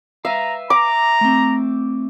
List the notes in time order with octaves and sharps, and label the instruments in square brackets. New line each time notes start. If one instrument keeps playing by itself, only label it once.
[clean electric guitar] B4 F5 [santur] E5 [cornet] A#5
[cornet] A#5 [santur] D6
[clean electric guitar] A3 C4